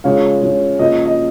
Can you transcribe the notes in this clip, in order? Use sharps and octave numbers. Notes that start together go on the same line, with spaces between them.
C#3 F3 G#3 C#4 C#5 F5
C#3 F3 G#3 C#4
C#3 F3 A#3 D#5
D#5